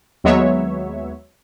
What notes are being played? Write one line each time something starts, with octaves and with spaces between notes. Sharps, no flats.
D#2 F#3 G#3 B3 C#5 E5